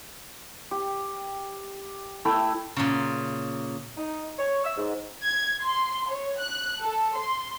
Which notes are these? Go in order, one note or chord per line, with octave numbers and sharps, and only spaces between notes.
G4
A3 E4 E5 G5
A#2 C#3
D#4
C#5
E6
G#2
G#6
C6
C#5
F#6
A4
C6